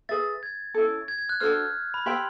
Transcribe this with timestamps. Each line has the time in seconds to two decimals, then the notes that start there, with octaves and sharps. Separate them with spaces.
0.09 G#4 B4 E5 A6
0.43 G#6
0.74 C#4 E4 A4
1.08 G#6
1.18 G#6
1.29 F#6
1.40 D4 F#4 A4 C5 F6
1.94 B5
2.06 G4 C5 E5 G5 C6